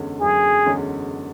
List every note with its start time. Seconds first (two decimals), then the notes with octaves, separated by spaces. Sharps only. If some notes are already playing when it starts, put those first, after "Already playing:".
Already playing: F#1 E2 D3 G#3 C#4
0.21 F#1 G#4
0.66 E2 D3 G#3 C#4